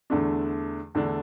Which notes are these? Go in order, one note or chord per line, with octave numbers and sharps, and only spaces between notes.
E2 D3 A3 D4
E2 D3 A3 D4